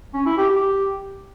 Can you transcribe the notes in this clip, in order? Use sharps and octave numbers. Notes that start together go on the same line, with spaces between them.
C#4
E4
G4
G4